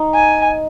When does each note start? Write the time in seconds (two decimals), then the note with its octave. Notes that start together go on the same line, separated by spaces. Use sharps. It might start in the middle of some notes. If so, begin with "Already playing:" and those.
Already playing: D#4
0.15 G#5